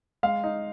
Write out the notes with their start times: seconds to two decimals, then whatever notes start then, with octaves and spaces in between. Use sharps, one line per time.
0.23 G#3 F5
0.44 D#4